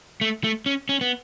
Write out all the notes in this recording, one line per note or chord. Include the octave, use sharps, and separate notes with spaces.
A3
A3
C#4
C#4
B3